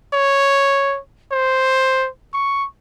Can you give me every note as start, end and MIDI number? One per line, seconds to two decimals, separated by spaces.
0.13 0.99 73
1.32 2.08 72
2.33 2.66 85